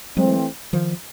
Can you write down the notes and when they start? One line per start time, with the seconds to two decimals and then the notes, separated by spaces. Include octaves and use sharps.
0.17 E3 F#3 G#3 A3 C4
0.73 D#3 F3